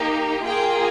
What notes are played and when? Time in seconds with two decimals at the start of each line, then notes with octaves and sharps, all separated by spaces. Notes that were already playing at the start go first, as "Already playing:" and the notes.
Already playing: A#3 D#4 G4
0.45 A#3 F4 G#4 G5